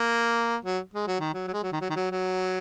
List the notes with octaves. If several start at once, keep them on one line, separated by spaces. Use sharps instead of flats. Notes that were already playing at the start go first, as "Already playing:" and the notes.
Already playing: A#3
F#3
G#3
F#3
D#3
F#3
F#3
G#3
F#3
D#3
F#3
D#3
F#3
F#3